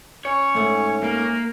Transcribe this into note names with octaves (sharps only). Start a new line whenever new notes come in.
C#4 C#5
G#2 A3
A#3